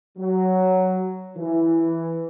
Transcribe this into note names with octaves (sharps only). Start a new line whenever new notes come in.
F#3
E3